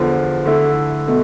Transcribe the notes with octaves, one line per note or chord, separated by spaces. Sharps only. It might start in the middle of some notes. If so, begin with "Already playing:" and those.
Already playing: E2 D3 F3
D3 A3 E4
B2 A3